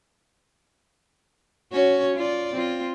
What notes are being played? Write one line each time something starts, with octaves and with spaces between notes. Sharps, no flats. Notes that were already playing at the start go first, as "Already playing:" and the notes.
C#4 F#4 C#5
F4 D5
C4 F4